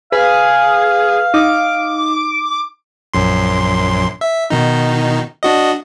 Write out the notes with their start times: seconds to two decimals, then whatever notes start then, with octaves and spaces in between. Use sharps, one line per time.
0.12 G#4 B4 F5
1.34 D#4 D6
3.14 A#1 F#2 C6
4.21 E5
4.50 B2 D#3 D#4
5.43 D4 F#4 D#5